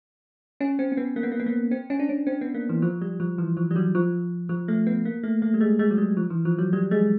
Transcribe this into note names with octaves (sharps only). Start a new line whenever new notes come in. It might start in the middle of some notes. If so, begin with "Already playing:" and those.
C#4
C4
C4
B3
A#3
B3
A#3
B3
A#3
C4
C#4
D4
C#4
C4
B3
A#3
E3
F3
G3
F3
E3
F3
G3
F#3
F3
F3
A3
B3
A#3
A3
A3
G3
G#3
G#3
F#3
G3
F3
E3
F3
F#3
G3
G#3